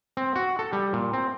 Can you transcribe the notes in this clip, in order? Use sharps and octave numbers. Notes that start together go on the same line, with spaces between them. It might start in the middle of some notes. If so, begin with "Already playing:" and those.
C4
F#4
A4
G3
A#2
C4